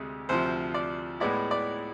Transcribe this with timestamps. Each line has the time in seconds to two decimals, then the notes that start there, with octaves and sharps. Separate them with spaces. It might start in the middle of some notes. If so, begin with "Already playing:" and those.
Already playing: D2 C3 G#3
0.29 D2 C3 F3 C5
0.74 D5
1.20 A2 G#3 B3 E4 D5
1.51 D5